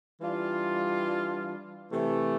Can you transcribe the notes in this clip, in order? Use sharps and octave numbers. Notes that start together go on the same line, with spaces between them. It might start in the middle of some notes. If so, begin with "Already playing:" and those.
E3 G3 D4 F4
C3 E3 A3